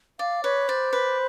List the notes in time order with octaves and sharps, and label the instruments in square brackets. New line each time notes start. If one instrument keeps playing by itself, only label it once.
[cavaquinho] D5 [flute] F5
[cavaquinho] B4 [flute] C#5
[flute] C5 [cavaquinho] D5
[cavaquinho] B4